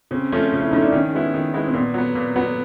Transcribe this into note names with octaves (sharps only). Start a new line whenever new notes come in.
C#3 C4
F3 A3 C#4
C#3
E4
F3 A3 C#4 D#4
D4
D#3 C#4
G#3 B3 E4
D#3
G#3 B3 E4
C4
A#2 B3
F#3 B3
A#2 A#3
F#3 B3